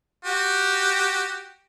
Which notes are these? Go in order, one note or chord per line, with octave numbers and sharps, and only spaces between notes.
F#4 G4